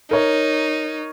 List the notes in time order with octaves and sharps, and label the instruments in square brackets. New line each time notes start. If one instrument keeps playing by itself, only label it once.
[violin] D#4 [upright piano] A#4 C#5